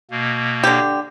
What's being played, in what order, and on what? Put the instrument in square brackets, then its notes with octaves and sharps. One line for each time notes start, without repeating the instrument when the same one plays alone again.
[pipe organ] B2 A#3
[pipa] D3 G4